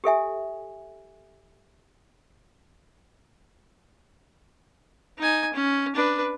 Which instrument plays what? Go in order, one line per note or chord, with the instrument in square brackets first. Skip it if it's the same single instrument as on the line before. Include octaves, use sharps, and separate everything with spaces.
[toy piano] G4 A4 E5 G#5
[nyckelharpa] D#4 G#5
C#4
D4 B4